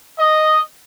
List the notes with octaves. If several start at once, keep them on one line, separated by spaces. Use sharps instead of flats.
D#5